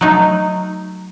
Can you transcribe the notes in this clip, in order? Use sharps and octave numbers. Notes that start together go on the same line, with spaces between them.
F#3 A3 D#4